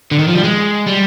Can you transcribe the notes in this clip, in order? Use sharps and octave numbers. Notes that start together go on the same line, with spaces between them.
D3
D#3
F3
G3
G#3
G3